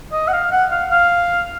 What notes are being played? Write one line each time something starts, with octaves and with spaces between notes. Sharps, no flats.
D#5
F#5
F5
F#5
F5
F5